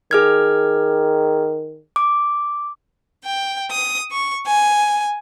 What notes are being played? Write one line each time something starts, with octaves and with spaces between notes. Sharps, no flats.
D#3 G#4 F6 G#6
D6
G5
D#6
C#6
G#5